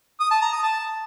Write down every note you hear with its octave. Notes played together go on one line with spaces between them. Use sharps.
D#6
A5
A#5
D#6
A5